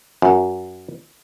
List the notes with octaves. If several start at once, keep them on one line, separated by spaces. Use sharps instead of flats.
F#2